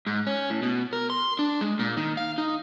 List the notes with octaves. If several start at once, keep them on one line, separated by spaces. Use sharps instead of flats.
G#2
C#4
A2
B2
A#4
C6
D4
G#3
A#2
D#3
F5
D#4